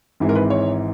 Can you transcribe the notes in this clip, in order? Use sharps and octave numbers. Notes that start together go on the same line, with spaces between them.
G#1 G#2 E3 G#3 C4
A#4
B4
C#5